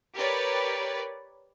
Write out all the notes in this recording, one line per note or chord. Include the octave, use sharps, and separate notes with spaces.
G4 A#4 B4 C#5 D5